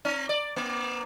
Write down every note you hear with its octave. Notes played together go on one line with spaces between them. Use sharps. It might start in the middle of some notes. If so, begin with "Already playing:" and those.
C4
D5
A#3